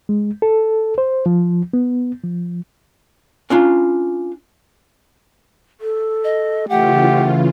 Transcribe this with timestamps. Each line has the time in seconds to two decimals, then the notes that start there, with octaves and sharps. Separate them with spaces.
0.09 G#3
0.42 A4
0.98 C5
1.26 F3
1.73 B3
2.24 F3
3.50 C#4 D4 F4
5.81 A4
6.24 D#5
6.70 C#3 E3 A3 F4 G4 F#5